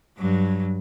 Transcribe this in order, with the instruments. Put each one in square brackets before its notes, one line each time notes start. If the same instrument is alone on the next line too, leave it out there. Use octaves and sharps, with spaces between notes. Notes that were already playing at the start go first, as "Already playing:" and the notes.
[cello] G2 F#3